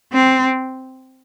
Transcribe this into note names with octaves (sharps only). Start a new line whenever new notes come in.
C4